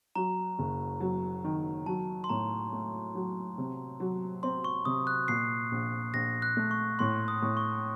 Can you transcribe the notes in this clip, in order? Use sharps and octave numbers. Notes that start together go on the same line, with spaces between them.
F#3 A#5
F#1
F#3
D#3
F#3 A5
C6
A2 A#5
A3
F#3
C3
F#3
C4 C6
C#6
C3 D#6
F#6
A#2 C7
A#1
A#1 A#6
F#6
A3
C#6
A2 C6
D#6
A2
C#6